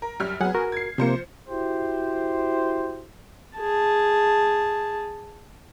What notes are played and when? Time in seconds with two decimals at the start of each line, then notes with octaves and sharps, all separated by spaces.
0.02 A#4
0.20 F#2 G3 F6
0.41 F#3 B3 G#4 F#5
0.55 F#4 A#4
0.72 G#6 C7
0.98 C3 F3 A#3 C5 C#7
1.48 E4 F#4 G4 C5
3.58 G#4 A5